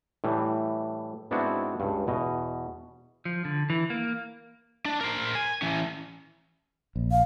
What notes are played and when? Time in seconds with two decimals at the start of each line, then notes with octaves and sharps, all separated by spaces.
0.24 A2 E3 G3
1.31 G#2 B3 C4 D4 E4 F#4
1.80 C#2 G2
2.07 E2 B2 D#5
3.25 F3
3.45 D3
3.70 E3
3.90 A#3
4.85 D4
5.01 A#4 C5
5.35 G#5
5.62 E3 C#4
6.96 A#1
7.12 F5